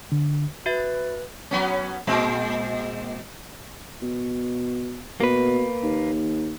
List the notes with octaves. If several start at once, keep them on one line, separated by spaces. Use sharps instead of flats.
D3
F#4 B4 E5 A6
F#3 B3 C#4
A#2 G#3 C4
B2
B2 A#3 B4
D#2